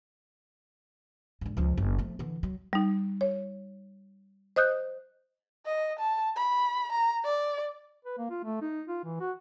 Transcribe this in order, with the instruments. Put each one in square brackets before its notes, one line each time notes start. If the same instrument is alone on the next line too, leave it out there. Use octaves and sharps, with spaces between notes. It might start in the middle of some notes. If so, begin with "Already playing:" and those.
[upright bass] G#2 D3
C#2 F3
F#1
F3 A3
D3 E3
F#3
[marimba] G3 D#4
C#5
C5 D#5 D#6 F#6 G6
[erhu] D#5
A5
B5
A#5
D5
[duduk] B4
A#3
F4
A3
D#4
F4
E3
F#4